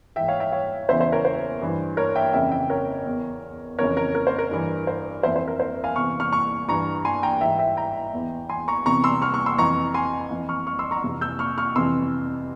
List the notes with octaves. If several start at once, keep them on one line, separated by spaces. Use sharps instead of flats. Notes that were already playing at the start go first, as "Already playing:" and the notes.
G#2 E3 E5 G5
C#5 F5
E5 G5
C#5 F5
E2 C#3 E3 C5 E5
C5 E5
A#4 C#5
C5
G2 E3
A#4 C#5
E5 G5
F2 C#3 E3 E5 G5
E5 G5
A#4 C#5
E2 E3
F2 C#3 E3 A#4 C#5
A#4
A#4
C5
A#4
G2 E3
C5
F2 E3 C5 E5
C5
A#4
C5
F5 G#5
E2 C3 E3 C#6 F6
C#6 F6
C#6 F6
G2 E3 A#5 C#6
G#5 C6
G5 A#5
G#2 E3 E5 G5
E5 G5
G5 A#5
E2 E3
G#5 C6
A#5 C#6
E2 C3 E3 A#5 C#6
C6 E6
C#6 F6
C#6 F6
C6 E6
F2 E3 A#5 C#6
G#5 C6
F2 E3
C#6 F6
C#6 F6
C6 E6
A#5 C#6
F2 C3 E3
E6 G6
C#6 F6
C#6 F6
F2 C3 E3 C6 E6